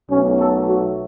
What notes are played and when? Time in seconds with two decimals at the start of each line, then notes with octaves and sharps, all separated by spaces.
0.10 B1 B2 F#3 A3 C#4
0.40 A4
0.68 F#4